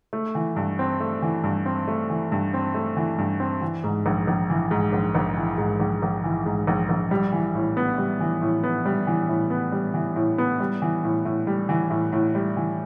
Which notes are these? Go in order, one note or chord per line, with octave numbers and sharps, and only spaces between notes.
A3
E3
G2
C4
A3
E3
G2
C4
A3
E3
G2
C4
A3
E3
G2
C4
E3
G#2
A#1
A#1
E3
G#2
A#1
A#1
E3
G#2
A#1
A#1
E3
G#2
A#1
A#1
G3
E3
A2
B3
G3
E3
A2
B3
G3
E3
A2
B3
G3
E3
A2
B3
G3
E3
A2
A2
G3
E3
A2
A2
G3
E3